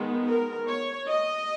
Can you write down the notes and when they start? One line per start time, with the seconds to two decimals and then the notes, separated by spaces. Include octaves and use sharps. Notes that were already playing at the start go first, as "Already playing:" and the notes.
Already playing: D#3 G#3 B3
0.28 A#4
0.68 C#5
1.08 D#5